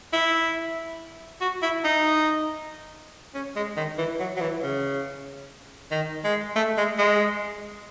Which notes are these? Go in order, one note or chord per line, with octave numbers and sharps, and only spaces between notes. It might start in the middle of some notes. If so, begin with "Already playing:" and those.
E4
F#4
E4
D#4
C#4
G#3
D#3
E3
F#3
F#3
E3
C#3
D#3
G#3
A3
G#3
G#3